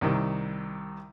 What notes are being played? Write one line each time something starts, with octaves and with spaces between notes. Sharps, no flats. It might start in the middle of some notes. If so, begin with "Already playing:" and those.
C2 C3 D#3